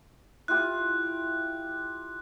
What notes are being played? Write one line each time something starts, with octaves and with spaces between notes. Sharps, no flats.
E4 F4 G4 F#6